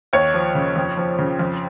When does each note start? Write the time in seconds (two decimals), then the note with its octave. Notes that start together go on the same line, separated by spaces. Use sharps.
0.13 D#2 C#5
0.34 F3
0.55 C#3
0.76 F2
0.97 F3
1.19 C#3
1.39 F2